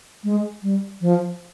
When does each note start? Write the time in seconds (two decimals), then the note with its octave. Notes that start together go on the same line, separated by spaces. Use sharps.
0.24 G#3
0.63 G3
1.01 F3